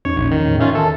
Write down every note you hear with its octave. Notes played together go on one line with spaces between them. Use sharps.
E2 C#4 D#4 C#5
A#1
D#3
E2 A2 C#4
D#3 C#4 F4 E5
D#3 A4 A#4 A5